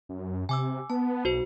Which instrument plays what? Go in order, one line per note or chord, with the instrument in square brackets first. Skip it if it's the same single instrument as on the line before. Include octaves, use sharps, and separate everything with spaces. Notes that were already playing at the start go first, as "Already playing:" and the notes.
[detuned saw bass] F#2
[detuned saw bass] C3 [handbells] G#5 D6 E6
[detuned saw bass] B3 [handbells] A5
[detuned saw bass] B1 [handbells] F#4 C5